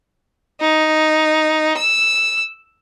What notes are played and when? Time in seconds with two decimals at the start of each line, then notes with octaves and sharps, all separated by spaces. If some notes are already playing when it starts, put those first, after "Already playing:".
0.61 D#4
1.77 E6